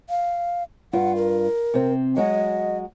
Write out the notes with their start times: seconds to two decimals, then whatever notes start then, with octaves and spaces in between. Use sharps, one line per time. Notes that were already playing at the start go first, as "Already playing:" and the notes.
0.10 F5
0.93 G2 F4 F#5
1.16 A#4
1.74 C3 C4
2.16 F#3 G#3 F#4 D#5